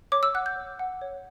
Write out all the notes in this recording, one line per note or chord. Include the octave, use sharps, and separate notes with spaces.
C#5 D6
E6
F#5 F#6
G6
C#5
F#5
C#5